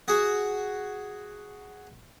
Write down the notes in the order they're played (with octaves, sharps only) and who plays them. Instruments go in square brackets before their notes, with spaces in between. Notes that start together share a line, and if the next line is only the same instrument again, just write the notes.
[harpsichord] F#4 G#4